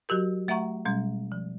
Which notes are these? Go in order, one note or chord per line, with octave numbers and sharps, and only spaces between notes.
F#3 F#4 G4 A#4
A3 E5 F#5 A#5 C#6
B2 G3 G#3 C#4
F3